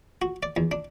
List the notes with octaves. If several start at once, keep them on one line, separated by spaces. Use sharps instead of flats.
F#4
D5
E2
D4